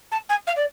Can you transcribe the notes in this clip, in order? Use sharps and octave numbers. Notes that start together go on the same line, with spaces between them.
A5
G#5
F5
D5